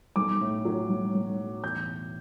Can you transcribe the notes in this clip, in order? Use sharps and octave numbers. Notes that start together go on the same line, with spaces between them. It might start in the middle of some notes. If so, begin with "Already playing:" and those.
B1 D6
A2
F#3
B1
B1
A2
E2 G6
B2